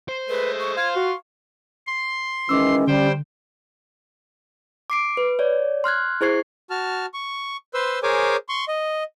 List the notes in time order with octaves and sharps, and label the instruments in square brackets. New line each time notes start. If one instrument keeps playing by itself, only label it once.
[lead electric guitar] C5
[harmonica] G#3 A3 [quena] B4
[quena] C#6
[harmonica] F5 C6 [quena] G#6
[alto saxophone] F#4 [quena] C#6
[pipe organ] C6
[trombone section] D#3 E3 G#3 [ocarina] C#4 [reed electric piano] D6 E6
[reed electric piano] D3 [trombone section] G3 [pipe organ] C5 G5
[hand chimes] D6 C7 D7
B4
C#5 D5
C6 F6 F#6 G#6
E4 G#4 C5 C#6 G#6 C7
[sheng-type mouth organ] F#4 A5 F6
C#6
B4 C5 C6 E6
G#4 A#4 C5 C#5 G#5 D6
C6 C#6
D#5